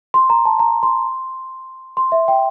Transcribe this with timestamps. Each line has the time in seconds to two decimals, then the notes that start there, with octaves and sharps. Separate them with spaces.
0.14 C6
0.30 A#5
0.45 A5
0.59 A#5
0.83 C6
1.97 C6
2.12 E5
2.28 G5